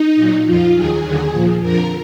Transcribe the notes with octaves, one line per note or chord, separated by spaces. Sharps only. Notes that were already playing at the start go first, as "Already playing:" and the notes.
Already playing: D#4
A#2 F#3
F2 F3 F4
D#2 D#3 F#3 G#4
D#2 D3 F#3
A#2 F3
F2 D3 F3 A#4